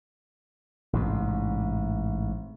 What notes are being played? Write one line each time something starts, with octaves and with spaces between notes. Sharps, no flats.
A1 G#2 C3